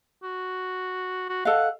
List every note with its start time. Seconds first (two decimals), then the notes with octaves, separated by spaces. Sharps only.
0.23 F#4
1.29 F#4
1.45 A4 D#5 F5 F#5